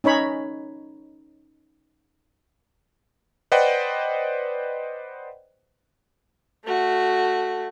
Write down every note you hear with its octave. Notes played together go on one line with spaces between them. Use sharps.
C#4 D#4 C#5 B5
B4 C5 D5 D#5 F#5 G5
A3 F#4